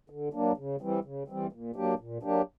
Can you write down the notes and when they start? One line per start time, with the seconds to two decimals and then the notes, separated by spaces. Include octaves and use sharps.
0.10 D3
0.33 F#3 A#3 D4
0.57 C#3
0.81 E3 G3 C4
1.04 C#3
1.28 E3 G3 C4
1.52 A#2
1.76 F#3 A#3 D4 G4
1.99 A#2
2.23 F#3 A#3 D4 G4